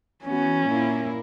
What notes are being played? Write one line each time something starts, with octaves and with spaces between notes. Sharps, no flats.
E3 B3 C#4 F#4
A#2 A#3 E4 A#4